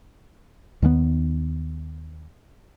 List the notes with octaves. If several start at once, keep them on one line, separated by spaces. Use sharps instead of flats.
D#2 D#3 G3 B3